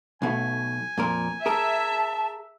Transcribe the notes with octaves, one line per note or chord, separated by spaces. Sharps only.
B1 B2 A3 G#5
F2 A#2 A#4
G#4 A#4 E5 A5